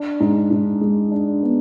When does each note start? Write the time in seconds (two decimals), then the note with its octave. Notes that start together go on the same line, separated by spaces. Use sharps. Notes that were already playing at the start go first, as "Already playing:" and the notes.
Already playing: D4
0.20 G#2
0.51 G#2
0.81 G#3
1.11 D4
1.43 B3